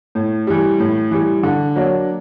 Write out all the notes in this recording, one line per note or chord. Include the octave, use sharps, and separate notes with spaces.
A2
E3 G3
A2
E3 G3
D3
F#3 A#3 D4